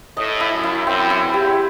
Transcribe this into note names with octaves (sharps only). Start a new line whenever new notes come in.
A2 D#5
E4
F#2
E4
F#2 C4
E4
E2
G4